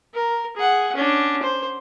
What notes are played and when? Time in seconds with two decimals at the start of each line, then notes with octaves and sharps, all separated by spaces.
0.15 A#4
0.57 G#4 F#5
0.96 C#4 D4
1.42 C5